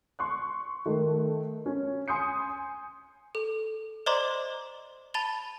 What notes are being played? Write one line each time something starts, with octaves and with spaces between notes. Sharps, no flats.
C6 C#6 F#6
D#3 A3
C#4
G#5 C6 D#6 G6 C#7
A4
C5 D5 D#5 A#5 C6 D6
A5 B5 A6 F7 G7